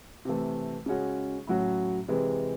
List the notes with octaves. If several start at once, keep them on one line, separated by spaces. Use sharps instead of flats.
C3 E3 A3
C#3 G#3 C#4 F#4
A2 F#3 C#4 F#4
C3 E3 G#3